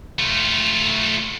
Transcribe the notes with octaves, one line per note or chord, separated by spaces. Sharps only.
A3 F4